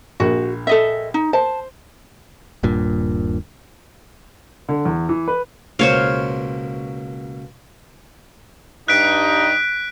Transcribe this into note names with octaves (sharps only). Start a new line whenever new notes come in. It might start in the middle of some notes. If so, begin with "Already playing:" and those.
A#1 F#4
A4 D#5 E5
D#4
C5 A5
D#1 G2 A#2
D3
E2
E3
B4
C#2 B2 A#3 C5 C#5 F5
G2 D#4 F#6 B6 D7